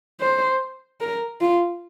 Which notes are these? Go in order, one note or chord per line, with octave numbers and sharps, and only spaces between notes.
C5
A#4
F4